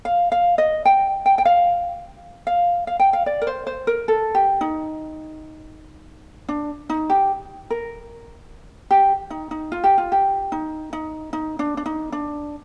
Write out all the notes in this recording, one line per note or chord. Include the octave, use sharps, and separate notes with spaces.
F5
F5
D#5
G5
G5
G5
F5
F5
F5
G5
F5
D5
A#4
C5
C5
A#4
A4
G4
D#4
D4
D#4
G4
A#4
G4
D#4
D#4
F4
G4
F4
G4
D#4
D#4
D#4
D4
D4
D#4
D4